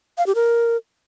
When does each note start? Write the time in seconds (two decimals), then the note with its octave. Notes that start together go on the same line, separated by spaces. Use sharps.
0.18 F5
0.26 G4
0.35 A#4